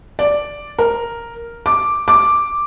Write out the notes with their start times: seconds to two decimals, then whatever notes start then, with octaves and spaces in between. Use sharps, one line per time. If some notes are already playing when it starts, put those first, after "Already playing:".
0.19 D5
0.79 A#4
1.66 D6
2.08 D6